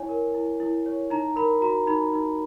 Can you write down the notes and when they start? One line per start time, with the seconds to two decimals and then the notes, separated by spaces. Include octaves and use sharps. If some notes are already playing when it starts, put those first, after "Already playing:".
Already playing: E4 C#5 G#5
0.09 A#4
0.34 E4
0.60 E4
0.86 C#5
1.10 D#4 A#5
1.36 A#4 B5
1.61 F#4 A#5
1.87 D#4 B5
2.12 D#4